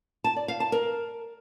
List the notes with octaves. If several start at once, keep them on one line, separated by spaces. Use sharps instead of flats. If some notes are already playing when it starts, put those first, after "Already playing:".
A5
D5
F5
A5
A#4